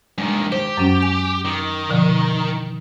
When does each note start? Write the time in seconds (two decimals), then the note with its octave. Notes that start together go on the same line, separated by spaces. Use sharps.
0.18 G2 D#3 G#3
0.52 G4 C5
0.77 F#2 F#3 C#4
1.03 G#5
1.45 D#3
1.90 B2 D3 F3